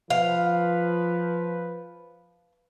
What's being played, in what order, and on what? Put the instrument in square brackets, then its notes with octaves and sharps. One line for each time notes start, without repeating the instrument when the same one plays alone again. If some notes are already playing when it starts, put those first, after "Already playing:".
[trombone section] F3 B4 [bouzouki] F5